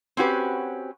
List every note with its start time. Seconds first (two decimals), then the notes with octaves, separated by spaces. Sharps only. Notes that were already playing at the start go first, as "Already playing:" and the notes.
0.17 C4 C#4 F#4 G4 B4